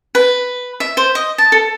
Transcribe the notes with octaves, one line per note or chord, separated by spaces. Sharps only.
B4
E5
C5
D#5
A5
A4